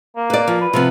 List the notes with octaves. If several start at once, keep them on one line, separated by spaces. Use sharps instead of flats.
A#3
B4 D5
F3
B4
C3 F3 B3